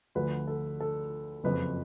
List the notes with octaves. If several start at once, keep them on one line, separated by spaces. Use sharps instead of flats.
D2 D3 F3 B4
A4
A4
F#1 F2 F3 B4